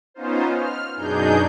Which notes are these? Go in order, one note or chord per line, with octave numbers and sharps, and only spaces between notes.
B3 C#4 D#4 F4 C5
F6
F#2 B2 D4 D#4 G#4 G6